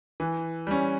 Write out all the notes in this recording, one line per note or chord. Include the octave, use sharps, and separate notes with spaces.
E3
G3 C#4